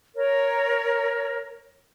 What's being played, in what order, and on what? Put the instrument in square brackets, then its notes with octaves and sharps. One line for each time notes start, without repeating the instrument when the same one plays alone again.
[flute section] A#4 C#5